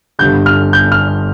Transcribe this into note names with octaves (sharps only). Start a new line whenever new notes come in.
G1 G2 D3 G6
F6
G6
F6